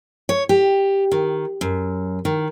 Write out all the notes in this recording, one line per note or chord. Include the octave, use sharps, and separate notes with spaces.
C#5
G4
D#3
F#2
D#3